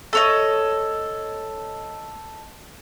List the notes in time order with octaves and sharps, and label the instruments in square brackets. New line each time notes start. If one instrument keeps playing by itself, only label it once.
[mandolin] A4 C#5 D#5